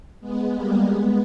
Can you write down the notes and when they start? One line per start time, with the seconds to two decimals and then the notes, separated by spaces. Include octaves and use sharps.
0.21 G#3 B3
0.54 G3 A#3
0.87 G#3 B3